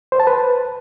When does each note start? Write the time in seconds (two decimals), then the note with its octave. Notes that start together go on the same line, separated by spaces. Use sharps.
0.12 C5
0.20 A5
0.27 B4